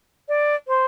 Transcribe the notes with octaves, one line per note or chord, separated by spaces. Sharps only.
D5
C5